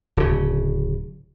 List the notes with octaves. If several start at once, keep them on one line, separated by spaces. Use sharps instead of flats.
D1 C#3